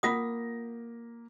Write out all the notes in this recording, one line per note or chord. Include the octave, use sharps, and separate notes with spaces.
A#3 F4 F#5 D#6 A#6 B6